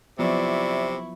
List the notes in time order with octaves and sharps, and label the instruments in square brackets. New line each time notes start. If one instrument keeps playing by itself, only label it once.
[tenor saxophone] C3 [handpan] F3 F#3 B3 [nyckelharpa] E4 C#6 [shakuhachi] D5